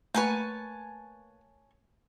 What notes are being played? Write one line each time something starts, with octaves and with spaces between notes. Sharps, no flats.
A3 A#3 B4 C#5 G#5 A5 C#6